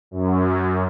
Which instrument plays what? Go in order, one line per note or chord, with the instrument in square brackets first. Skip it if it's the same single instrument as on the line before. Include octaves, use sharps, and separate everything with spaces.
[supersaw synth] F#2